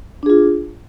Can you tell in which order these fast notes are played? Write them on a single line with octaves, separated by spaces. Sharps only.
D4 G#4 F4